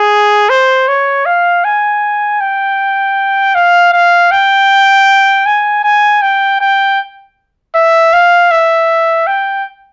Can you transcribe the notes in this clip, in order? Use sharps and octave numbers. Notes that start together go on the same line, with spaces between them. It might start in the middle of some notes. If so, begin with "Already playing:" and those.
Already playing: G#4
C5
C#5
F5
G#5
G5
F5
F5
G5
G#5
G#5
G5
G5
E5
F5
E5
G5